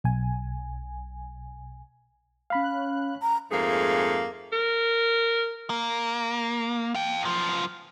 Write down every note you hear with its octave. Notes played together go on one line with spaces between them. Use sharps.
B1 G#5
C#4 F5 B5 F#6
A#5
F2 G#2 A3 A#3 G#4
A#4
A#3
F5 G5
F#2 F3